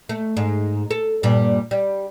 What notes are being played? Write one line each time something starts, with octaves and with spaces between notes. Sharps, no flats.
A3
G#2
A4
G2 A#2 G3
G3